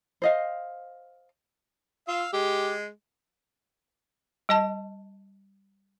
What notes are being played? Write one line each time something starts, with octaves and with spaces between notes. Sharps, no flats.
C5 D#5 F5
F4 F5 E6
G#3 G4
G3 D#5 A5